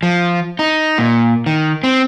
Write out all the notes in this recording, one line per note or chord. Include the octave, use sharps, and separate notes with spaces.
F3
D#4
A#2
D#3
C4